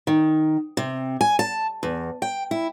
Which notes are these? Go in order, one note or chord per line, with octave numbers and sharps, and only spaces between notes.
D#3
C3
G#5
A5
E2
G5
E4